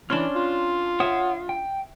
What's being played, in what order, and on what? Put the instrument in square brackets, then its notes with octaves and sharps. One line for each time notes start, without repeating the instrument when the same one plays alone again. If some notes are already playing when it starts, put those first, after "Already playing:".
[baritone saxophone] E3 [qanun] C#4 D4 [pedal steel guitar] A5 C6 F6
[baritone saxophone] F4
[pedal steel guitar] C#5 F#5 D#6 [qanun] E5
[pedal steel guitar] G5